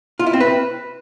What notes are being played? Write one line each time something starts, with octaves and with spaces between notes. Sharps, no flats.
F4
E4
C4
B4